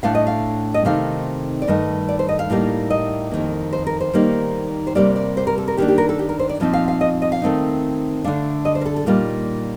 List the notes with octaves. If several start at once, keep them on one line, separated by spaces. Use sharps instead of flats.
A2 A3 D4 F5
D#5
F5
D#5
C3 D#3 A3 C4 D#4 F5
D5
G2 D#3 A3 D#5
D5
C5
D#5
F5
A2 G3 A#3 D#4
D#5
F2 D#3 A#3
C5
A#4
C5
D#3 G3 A#3 D#4
C5
C3 G3 A#3 D5
D5
C5
A#4
A4
A#4
D#3 A#3 D4 G4
G4
A#4
A4
G4
A#4
C5
D5
A#2 F3 C4 D#4
F5
F5
D#5
D#5
F5
D#3 A3 C4 D#4
D3 A3 D4 F5
D#5
C5
A#4
A4
A4
A#2 G3 A#3 D#4 F4